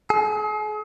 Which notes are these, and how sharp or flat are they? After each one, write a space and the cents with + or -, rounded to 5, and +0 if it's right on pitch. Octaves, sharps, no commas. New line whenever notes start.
G#4 +40